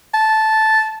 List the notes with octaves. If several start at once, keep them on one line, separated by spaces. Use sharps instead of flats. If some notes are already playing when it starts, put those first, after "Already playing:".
A5